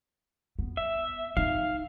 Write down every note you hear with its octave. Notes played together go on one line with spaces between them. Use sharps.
B3
E5
D#4 F5